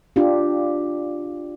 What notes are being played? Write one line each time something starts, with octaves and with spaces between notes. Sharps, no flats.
D4 F4 G4